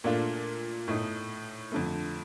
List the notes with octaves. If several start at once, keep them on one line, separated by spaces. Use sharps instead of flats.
A#2 A3 D4 F4
A2 A3 D#4
F2 D3 A3